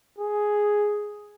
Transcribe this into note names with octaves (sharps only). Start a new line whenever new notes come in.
G#4